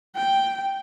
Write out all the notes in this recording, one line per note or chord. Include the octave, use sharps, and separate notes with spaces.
G5